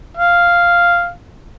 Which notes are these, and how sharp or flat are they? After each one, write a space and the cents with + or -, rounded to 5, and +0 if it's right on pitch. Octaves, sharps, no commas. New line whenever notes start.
F5 -5